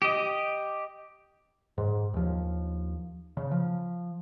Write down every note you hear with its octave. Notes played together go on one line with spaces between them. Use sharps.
G4 D#5
G#2
D#2 F3
C#3
F3